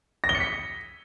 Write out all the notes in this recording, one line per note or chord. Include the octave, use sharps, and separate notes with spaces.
A#6
G7
C#7
B6